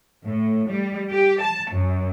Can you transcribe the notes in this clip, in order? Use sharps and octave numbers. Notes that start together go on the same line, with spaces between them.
A2
G3
G4
A5
F#2